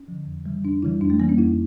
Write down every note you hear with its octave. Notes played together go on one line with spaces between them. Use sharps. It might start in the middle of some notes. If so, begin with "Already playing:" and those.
Already playing: C#4
D3 F3
F2
C#3 E3 G3
F2 D4
C#3 E3 G3 E4
F2 D4
A3
E3 G3 A#3
C#4
F2 E4